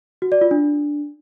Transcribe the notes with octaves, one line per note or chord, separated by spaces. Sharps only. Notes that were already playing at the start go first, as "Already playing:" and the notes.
F#4
D5
F4
D4